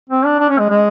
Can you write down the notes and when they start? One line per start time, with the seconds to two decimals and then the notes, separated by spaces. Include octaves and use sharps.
0.10 C4
0.25 D4
0.40 D4
0.49 C#4
0.59 G#3
0.69 G#3